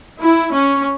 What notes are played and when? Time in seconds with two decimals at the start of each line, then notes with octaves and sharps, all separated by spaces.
0.20 E4
0.53 C#4